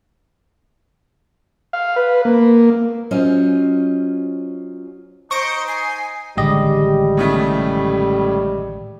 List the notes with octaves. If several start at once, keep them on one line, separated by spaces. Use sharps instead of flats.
F5
B4
A#3
F#3 C#4 F4 C5 D#5
D#4 C5 C#6 A#6 C#7 D7
G#5 C7
A1 D3 D#3 G3 G#3 G4 D#5
A2 C#3 A3